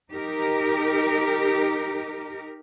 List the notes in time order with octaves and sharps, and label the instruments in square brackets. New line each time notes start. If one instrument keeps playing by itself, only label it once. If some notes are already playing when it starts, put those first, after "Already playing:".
[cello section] D#4 G4 A#4